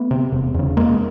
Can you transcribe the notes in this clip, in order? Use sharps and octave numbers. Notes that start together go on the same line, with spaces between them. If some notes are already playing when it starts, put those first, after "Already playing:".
Already playing: A3 B3
C3
E1
E2 C#3
E1 G#3 A#3